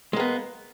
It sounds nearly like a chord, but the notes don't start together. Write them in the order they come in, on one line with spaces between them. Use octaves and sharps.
G#3 A#3 B3